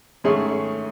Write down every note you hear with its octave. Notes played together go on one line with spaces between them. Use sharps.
G#2 D#3 A3 C#4 G#4